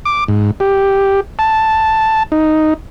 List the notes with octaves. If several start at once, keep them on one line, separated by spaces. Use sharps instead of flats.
D6
G#2
G4
A5
D#4